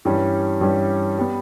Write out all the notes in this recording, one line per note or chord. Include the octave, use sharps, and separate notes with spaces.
G2 E3 G3 C#4
G2 E3 G3 C#4
G3 B3